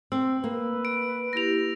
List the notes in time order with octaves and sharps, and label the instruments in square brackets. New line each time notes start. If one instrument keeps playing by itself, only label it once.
[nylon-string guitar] C4 [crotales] E6
[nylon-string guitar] A#3 [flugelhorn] B4
[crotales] D7
[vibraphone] A#3 E4 G4 [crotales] A#6 F7